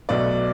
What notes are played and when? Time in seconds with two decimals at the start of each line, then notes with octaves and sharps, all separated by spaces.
0.09 B1 B2 A3 D5